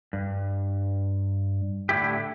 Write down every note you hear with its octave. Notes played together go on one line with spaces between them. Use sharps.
G2
A2 D3 E4 G4